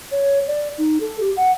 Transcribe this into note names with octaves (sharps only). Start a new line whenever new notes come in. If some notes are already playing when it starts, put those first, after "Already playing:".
C#5
D5
D#4
A4
G4
F#5